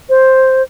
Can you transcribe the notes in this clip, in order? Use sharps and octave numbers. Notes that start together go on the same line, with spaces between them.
C5